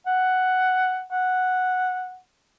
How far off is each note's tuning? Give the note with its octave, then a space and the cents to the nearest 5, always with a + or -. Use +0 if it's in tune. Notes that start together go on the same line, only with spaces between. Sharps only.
F#5 +5
F#5 -5